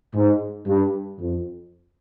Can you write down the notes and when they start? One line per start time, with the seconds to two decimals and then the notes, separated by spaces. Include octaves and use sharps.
0.14 G#2
0.66 G2
1.20 F2